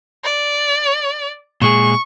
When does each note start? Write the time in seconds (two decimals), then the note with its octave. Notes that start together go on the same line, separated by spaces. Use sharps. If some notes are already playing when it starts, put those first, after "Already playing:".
0.25 D5
1.62 A#2 G#3 G#4 C#6